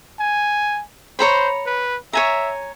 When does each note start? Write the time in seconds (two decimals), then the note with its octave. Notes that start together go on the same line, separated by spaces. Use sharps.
0.20 G#5
1.19 C5 C#5 A#5 B5
1.66 B4
2.13 C#5 E5 G#5 A#5